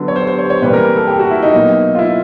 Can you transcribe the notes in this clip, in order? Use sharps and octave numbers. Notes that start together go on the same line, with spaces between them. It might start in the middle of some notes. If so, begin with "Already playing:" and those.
Already playing: D3 F#3 B3
C#5
C5
C5
C#5
C#5
C3 E3 G3 A#3 B4
A#4
A4
G4
F#4
E4
D#4
B2 F#3 A#3
F4
E4